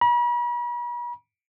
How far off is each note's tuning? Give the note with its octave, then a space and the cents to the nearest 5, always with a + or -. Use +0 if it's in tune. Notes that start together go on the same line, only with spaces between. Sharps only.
B5 -45